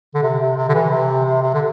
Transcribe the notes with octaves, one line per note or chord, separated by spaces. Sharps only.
D3
C3
C3
C3
D3
E3
C3
C3
C3
D3